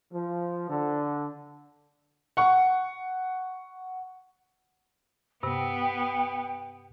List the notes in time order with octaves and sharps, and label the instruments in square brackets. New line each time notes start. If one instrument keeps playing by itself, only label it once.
[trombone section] F3
D3
[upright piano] F#5 C#6
[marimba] G2 C3 [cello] B3 [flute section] G5